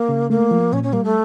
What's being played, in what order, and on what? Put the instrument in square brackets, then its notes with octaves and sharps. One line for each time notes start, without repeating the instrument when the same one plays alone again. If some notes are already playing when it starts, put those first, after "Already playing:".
Already playing: [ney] A#3
[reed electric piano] C#3
[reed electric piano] A3 [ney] A#3
[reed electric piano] F3
[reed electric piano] A#2 [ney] C#4
[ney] C#4
[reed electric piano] G3 [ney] A#3
[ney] A3